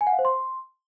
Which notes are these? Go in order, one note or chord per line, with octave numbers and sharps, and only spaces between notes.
G#5
F#5
F5
C5
C6